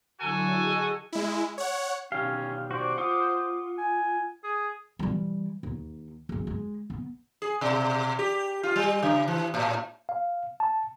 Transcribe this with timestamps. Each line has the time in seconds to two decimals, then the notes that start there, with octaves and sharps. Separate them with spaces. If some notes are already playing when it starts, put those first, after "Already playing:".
0.20 D3 F#3 E4 F#4 A4 G#5
0.59 G#4 D#5
1.12 G#3 E4
1.58 C#5 F#5
2.12 B2 D#3 C#4 G4 F5
2.71 F#4 C5 D5
2.98 F4 F#5 D6 D#6
3.78 G#5
4.44 G#4
4.99 E3 G3
5.63 D#2
6.29 F#1 G#3
6.47 G#3
6.90 B3
7.42 G#4
7.61 B2
8.19 G4
8.63 F4
8.76 G3
9.03 C#3
9.28 E3
9.54 A2
10.09 F5
10.60 A5